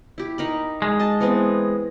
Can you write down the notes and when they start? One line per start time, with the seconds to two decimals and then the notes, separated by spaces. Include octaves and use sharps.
0.18 E4 G4
0.38 D#4 A#4 B5
0.82 G#3
0.99 D#5 A5
1.20 E3 B3 C4